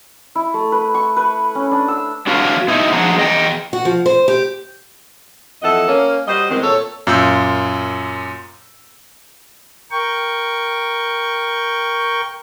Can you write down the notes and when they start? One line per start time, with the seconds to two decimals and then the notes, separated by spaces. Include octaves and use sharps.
0.35 E4
0.54 A3
0.72 B4
0.94 C#6
1.16 B4
1.55 C#4
1.71 D4
1.88 E6
2.27 F#3 D4 F#4 B4 F5
2.68 B2 D#4 E4
2.93 F3 D4 G#4 F#5 A#5
3.17 E2 D#5 G5
3.73 F#4
3.85 F3
4.06 C5
4.28 G4
5.62 F2 E3 A4 D#5 F#5
5.88 A#3 C#4
6.28 G3 F#4 C5 D#5
6.49 E2 D#3 G#3 C4
6.62 A#2 A4 C#5
7.07 F#2 A#2 F4 D6 E6 G6
9.91 A#4 G5 C#6